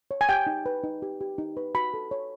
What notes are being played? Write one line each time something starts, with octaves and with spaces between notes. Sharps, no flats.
C#5
G#5
G4 G5
D#4
B4
D#4
G4
G4
D#4
B4
F#4 B5
A4
C#5